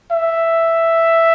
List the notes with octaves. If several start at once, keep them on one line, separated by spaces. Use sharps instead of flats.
E5